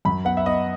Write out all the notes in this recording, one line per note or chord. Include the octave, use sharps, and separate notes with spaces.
F#2 B5
B3 F#5
E5
B3 D#5